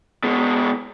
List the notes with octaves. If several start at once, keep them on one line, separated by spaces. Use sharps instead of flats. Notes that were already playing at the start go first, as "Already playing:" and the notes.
B2 G#3